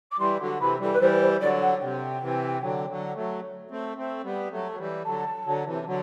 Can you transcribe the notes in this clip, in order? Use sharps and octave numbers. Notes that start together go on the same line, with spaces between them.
D6
E3 G3 C6
D3 F#3
C3 E3 B5
E3 G3 A4
B4
E3 G3 C5
C5
D3 F#3 D5
F#5
C3 G5
C3 E3
D3 F#3
D3 F#3
F#3 A3
A3 C4
A3 C4
G3 B3
F#3 A3
F#3
E3 G3
D3 F#3 A5
D3 F#3
C3 E3
D3 F#3